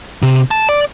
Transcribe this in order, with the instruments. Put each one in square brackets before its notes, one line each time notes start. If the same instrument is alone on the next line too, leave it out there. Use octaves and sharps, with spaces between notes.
[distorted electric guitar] C3
A5
D5